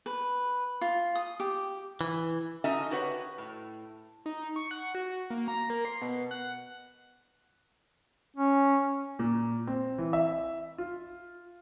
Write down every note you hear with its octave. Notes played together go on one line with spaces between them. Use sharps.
B4
F4
D#6
G4
E3
C#4 D#4 F#4 A4 D#5 E5
F#4 G4 B4 C#5 F#5
A2
D#4
C#6
F#5
F#4
A#3
A#5
A#3
C6
B2
F#5
C#4
A#2
C4
E3
E5
F4